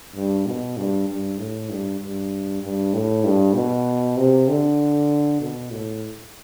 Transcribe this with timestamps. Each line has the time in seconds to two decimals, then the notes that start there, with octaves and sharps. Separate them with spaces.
0.15 G2
0.46 B2
0.77 G2
1.08 G2
1.39 A2
1.70 G2
2.01 G2
2.63 G2
2.93 A2
3.24 G2
3.55 B2
4.17 C3
4.48 D3
5.40 B2
5.71 A2